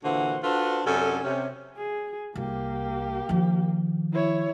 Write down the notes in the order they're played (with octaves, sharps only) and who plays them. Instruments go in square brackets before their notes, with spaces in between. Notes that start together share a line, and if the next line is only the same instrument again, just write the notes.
[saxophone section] A#2 D3 E3 F#4 C5 F#5
D4 F4 F#4 A4 B4 C5
F#2 C3 C#4 D4 A4
C3 C#4
[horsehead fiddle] G#4
[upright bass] C2 [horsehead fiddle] A#3 G4
[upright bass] D#3 F3
[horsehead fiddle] E4 C#5